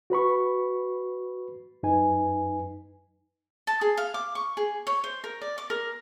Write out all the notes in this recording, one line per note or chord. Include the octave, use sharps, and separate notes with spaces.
F#4 B4 B5 C#6
F#2 D#4 B4 G#5
A5
G#4
F5
D6
C#6
G#4
C#5
C5
A#4
D5
D6
A#4